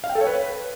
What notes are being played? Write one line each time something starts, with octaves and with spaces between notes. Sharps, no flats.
F5
G5
A4
C#5
B4